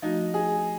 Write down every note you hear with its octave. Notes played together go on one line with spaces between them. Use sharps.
F3 A3 D4 D#4 F#4
G#4